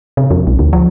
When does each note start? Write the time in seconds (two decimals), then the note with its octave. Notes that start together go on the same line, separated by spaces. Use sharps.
0.17 C3
0.31 F2
0.47 B1
0.59 D2
0.73 F3